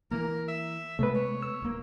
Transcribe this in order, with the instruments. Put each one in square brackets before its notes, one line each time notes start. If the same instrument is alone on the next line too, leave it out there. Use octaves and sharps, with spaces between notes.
[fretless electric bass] E3 A#3 [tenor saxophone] A#4
[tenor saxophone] E5
[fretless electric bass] C3 G#3 B3 [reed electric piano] A3 B4
[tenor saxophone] C#5
[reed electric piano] E6
[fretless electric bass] D1 A#3